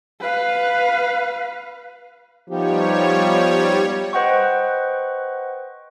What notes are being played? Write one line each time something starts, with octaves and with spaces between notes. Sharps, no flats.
B4 F5
F3 G3 B3 D#4 G4 C#5
B4 C5 D#5 F#5 G5 C#6